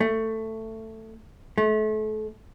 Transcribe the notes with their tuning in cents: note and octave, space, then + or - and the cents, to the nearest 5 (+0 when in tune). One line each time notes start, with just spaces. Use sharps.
A3 +15
A3 -35